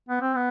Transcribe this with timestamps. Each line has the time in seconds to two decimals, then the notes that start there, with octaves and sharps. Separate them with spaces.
0.09 B3
0.21 C4
0.36 B3